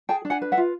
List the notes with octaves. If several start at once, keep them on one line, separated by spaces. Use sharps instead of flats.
G#4 G5 A5
D4
F#5 G#5
B4
E5 F#5
F4